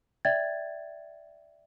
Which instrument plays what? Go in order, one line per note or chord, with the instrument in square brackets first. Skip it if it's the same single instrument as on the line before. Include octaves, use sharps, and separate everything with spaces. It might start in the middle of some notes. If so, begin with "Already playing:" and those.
[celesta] D5 E5 G5 G#6 A6